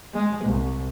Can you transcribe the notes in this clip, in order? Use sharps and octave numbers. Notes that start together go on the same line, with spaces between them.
G#3
C2